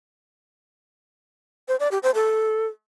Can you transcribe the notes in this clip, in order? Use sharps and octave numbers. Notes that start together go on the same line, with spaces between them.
C5
D5
G4
C5
A4